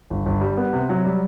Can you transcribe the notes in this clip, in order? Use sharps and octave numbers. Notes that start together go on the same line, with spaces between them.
G1
G1
G3
B3
C3
F#3
G3